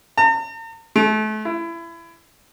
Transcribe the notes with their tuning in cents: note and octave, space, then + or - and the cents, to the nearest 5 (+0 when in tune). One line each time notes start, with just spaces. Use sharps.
A#5 -45
A3 -35
E4 +25